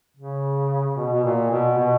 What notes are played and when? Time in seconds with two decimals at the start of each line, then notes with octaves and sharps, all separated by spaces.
0.17 C#3
0.97 B2
1.12 B2
1.24 A#2
1.51 B2
1.78 B2